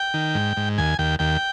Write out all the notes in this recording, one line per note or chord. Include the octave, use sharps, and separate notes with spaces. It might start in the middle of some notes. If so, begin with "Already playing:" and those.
Already playing: G5
D#3
G#2
G#2
D#2 G#5
D#2 G5
D#2 G5